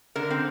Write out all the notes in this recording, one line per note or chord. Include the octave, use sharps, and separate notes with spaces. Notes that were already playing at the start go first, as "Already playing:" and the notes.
D3 A#4
C4